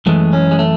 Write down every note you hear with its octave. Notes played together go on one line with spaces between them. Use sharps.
F#2 E3 G#3 A3
C#4
G#3
A3